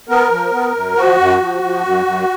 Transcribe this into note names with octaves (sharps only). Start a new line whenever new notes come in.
B3 A#4
F3
B3
F#2
F3 F#4
F#2
F3
F3
F#2
F#2